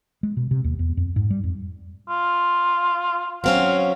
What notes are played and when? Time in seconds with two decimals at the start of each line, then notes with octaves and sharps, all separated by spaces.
0.23 G#3
0.37 B2
0.51 C3
0.64 D#2
0.79 E2
0.97 F2
1.16 G#2
1.30 G3
1.44 F2
2.09 F4
3.44 F#3 C4 C#4 F5